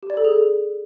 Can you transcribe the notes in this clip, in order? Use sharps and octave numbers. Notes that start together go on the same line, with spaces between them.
G4
D5
A4
G#4
A4